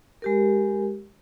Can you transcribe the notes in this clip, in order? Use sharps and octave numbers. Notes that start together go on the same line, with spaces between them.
G#3 G4 A#4